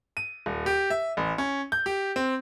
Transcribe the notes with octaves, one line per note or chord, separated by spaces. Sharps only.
D#7
D#1
G4
E5
A1
C#4
G6
G4
C4